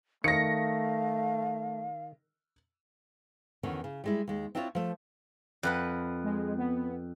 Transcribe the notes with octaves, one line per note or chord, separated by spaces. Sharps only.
D#3 A3 F5 A#6 C#7
E2 D3 D#3 C#4
C#3
G3 G#3 E4
D#2 G#3
C4 D4 E4 F4 A#4 C#5
F3 A3
F2 B4 F#5
G#3
B3